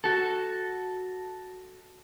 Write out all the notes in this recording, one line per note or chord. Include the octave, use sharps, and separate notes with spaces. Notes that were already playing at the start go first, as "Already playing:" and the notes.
F#4 A4